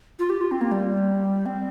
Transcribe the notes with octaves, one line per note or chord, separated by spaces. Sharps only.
F4
G4
F4
C4
A#3
G3
C4